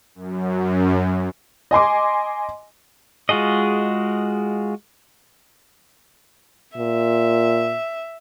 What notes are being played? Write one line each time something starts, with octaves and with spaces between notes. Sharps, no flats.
F#2
D#5 G#5 C6 D6
G#3 F4 F#4 G#4 D#5
A#2 E5